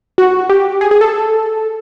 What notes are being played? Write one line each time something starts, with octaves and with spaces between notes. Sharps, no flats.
F#4
G4
G#4
G#4
A4